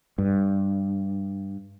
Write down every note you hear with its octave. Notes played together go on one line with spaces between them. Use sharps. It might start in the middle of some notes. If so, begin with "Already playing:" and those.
G2